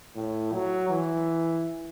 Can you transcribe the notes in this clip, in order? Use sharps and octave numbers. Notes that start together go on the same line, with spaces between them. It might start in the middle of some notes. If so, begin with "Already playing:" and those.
A2
F#3
E3